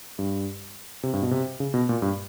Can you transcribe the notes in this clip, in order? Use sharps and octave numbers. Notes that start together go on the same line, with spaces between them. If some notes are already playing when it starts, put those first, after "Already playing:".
G2
C3
G2
B2
C3
C#3
B2
A#2
G2